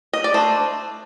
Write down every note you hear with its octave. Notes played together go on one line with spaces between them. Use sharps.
D#5
D5
A3 D4 C5